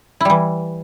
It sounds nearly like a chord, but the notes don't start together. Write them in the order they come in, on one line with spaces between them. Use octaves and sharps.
E4 G3 E3